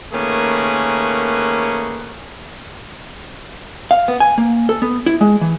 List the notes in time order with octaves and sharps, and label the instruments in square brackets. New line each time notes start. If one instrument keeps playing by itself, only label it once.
[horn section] D#3 A3 A#3 C#4 G#4 B4
[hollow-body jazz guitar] F5
B3
G#5
A#3
A4
B3
E4
G#3
E3